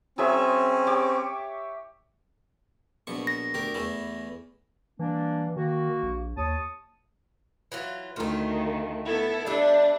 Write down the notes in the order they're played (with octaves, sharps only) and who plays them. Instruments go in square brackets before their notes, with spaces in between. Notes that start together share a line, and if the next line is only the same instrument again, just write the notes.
[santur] F#3 G#4 E5 [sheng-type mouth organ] C4 C#4
[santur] G4 C#5 D6
[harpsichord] A#1 B2 C#6
[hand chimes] A#6
[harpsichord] D2 G4 A#4
E2 E3 A3
[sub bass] E3 [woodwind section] G3 A#3 D4
[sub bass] D#3 [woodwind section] A#3 F#4
[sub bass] A#1
[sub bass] D#2 [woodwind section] C#5 A5 D#6
[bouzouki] E3 F#3 F4
[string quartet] D2 D#3 [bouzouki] A3 F4
[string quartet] B3 E4 A4
[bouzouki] G3 E5 [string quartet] D4